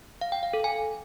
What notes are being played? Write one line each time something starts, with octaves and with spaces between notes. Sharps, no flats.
F5
G5
F5
A4
G#5